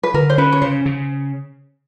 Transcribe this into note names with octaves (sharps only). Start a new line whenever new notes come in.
B4
D3 A#4
C5
C#4 B4
C#5
C#3 C5
C#3